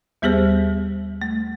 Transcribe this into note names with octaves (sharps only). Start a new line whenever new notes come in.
D#2 G3 B3 G4 G#4 C5
A3